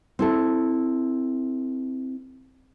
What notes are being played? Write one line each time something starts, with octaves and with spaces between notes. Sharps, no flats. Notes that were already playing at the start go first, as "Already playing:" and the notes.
C4 E4 A4